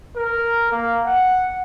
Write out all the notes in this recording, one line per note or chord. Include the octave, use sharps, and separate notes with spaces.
A#4
A#3
F#5